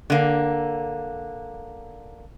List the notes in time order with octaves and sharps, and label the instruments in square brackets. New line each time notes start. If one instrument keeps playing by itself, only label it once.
[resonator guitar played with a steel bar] D3 A#3